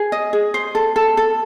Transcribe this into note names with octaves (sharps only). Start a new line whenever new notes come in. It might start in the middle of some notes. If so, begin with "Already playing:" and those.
Already playing: G#4
D#5
G#4
C5
A4
A4
A4